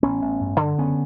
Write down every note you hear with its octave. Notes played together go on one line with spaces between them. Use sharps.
A1 B3 C#4
A1
G2
D3
F#1 B3 C#4